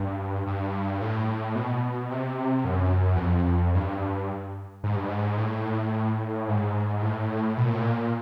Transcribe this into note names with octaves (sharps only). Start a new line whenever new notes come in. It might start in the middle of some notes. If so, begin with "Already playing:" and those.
Already playing: G2
G2
A2
B2
C3
F#2
E2
F2
G2
G#2
G2
G#2
A2
G#2
A2
B2
A#2
A2
A#2